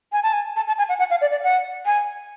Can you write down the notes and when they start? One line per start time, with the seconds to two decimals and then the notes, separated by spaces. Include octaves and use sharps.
0.12 G#5
0.23 A5
0.33 G#5
0.56 A5
0.67 A5
0.78 G#5
0.89 F#5
0.99 F#5
1.10 F5
1.21 D5
1.31 D5
1.43 F#5
1.86 G#5